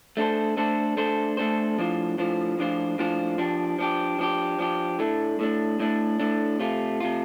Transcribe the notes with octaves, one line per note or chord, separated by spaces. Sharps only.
A3 D4 A4 C5
A3 D4 A4 C5
A3 D4 A4 C5
A3 D4 A4 C5
A2 F3 D4 F4 C5
A2 F3 D4 F4 C5
A2 F3 D4 F4 C5
A2 F3 D4 F4 C5
F3 D4 G4
F3 D4 G4
F3 D4 G4
F3 D4 G4
A2 A3 D4
A2 A3 D4
A2 A3 D4
A2 A3 D4
C3 A3 F4
C3 A3 F4